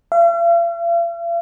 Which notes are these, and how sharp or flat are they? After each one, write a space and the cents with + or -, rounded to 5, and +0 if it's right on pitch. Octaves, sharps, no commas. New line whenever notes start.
F5 -45